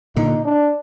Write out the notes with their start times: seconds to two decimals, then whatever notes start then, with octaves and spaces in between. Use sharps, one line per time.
0.16 A#2 D3 D#4
0.45 D4